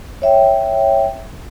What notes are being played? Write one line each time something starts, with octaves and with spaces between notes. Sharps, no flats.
C#5 E5 G5